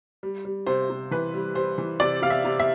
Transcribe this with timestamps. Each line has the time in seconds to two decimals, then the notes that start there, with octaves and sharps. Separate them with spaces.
0.23 G3
0.45 G3
0.66 C3 C5
0.90 C3
1.11 E3 B4
1.34 G3
1.55 G3 C5
1.78 E3
2.00 C3 D5
2.22 C3 F5
2.30 E5
2.45 C3
2.60 E5